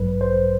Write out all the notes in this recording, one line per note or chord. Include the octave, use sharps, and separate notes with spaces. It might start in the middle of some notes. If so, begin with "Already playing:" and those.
Already playing: A1 G2 F#3 B4
C5